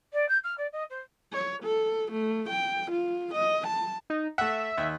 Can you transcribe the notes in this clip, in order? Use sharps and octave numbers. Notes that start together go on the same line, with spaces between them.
D5
G6
F6
D5
D#5
C5
C#5
A4
A3
G5
F4
D#5
A5
D#4
A3 E5 F#5
D#2